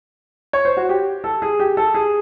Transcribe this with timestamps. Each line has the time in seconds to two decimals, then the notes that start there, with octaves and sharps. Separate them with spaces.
0.53 C#5
0.65 C5
0.77 F#4
0.89 G4
1.24 A4
1.42 G#4
1.60 G4
1.77 A4
1.94 G#4